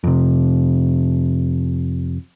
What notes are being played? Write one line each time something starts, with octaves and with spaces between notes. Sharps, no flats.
F2 C3